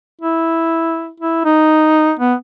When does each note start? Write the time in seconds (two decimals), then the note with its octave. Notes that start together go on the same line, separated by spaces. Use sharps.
0.22 E4
1.20 E4
1.45 D#4
2.20 B3